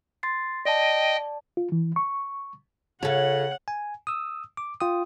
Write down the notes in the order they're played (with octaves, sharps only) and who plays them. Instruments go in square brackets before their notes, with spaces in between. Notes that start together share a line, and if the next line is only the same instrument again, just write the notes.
[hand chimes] C6 A6 C7
[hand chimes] D5 A5 [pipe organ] D#5 G5
[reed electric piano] F4
E3
C#6
[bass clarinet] C#3 [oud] F4 A4 [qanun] C#5 [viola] F#5
[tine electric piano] G#5
D#6 E6
D6
F4 G5 D#6